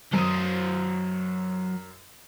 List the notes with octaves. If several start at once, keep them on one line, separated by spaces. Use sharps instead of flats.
F#2 F#3 C5 D#6